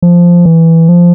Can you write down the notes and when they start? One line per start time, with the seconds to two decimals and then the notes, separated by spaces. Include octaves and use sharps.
0.02 F3
0.45 E3
0.89 F3